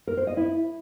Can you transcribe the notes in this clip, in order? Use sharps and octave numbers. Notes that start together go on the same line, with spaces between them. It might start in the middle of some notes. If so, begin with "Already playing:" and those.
A#4
C5
D#5
E4